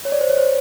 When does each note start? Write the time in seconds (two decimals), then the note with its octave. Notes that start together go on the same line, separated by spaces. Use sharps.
0.05 C#5
0.12 D5
0.21 C5
0.30 C#5
0.37 C5